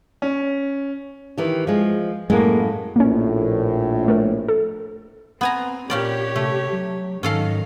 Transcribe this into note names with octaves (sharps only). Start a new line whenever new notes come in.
C#4
D#3 E3 G4
F3 G#3
F#2 A2 G#3 A#3
A#1 A2 A#3 C#4
A3 A#4
A4
B3 C4 G#5 A#5
A#2 C#4 G4 C#5 D5
C3 A3
F#3
G#2 D#3 F#3 C#4 A4 F5